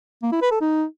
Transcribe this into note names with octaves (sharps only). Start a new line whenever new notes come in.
A#3
E4
B4
A4
D#4